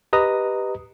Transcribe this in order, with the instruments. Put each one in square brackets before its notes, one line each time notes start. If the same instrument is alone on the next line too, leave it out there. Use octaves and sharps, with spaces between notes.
[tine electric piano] G4 B4 D#5 A#5 D#6